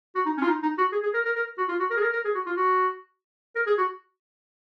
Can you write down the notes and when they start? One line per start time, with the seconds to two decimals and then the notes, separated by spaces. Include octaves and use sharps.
0.15 F#4
0.26 D#4
0.37 C#4
0.42 F4
0.48 D#4
0.63 D#4
0.78 F#4
0.92 G#4
1.03 G#4
1.14 A#4
1.25 A#4
1.36 A#4
1.58 F#4
1.69 F4
1.79 F#4
1.90 A#4
1.97 G#4
2.02 A#4
2.13 A#4
2.25 G#4
2.35 F#4
2.46 F4
2.57 F#4
3.55 A#4
3.67 G#4
3.78 F#4